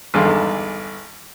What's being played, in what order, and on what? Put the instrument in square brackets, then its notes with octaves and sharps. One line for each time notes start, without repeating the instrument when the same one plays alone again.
[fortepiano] G#1 E2 G2 D3 F5 C6